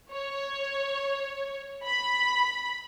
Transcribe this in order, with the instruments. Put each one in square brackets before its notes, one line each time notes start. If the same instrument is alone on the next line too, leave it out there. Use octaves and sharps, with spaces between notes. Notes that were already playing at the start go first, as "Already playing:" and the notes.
[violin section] C#5
B5